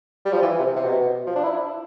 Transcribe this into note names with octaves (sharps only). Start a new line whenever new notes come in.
G3
F3
E3
C3
C3
B2
F3
D4
E4